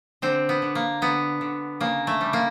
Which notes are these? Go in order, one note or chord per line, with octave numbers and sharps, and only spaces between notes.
D3 C4
B3
D3
A#3
D3 B3
D3
C#3 A#3
A3
G3
A#3